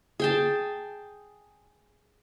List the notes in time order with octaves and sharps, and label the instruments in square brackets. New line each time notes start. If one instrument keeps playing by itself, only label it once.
[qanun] G#4 G5 A5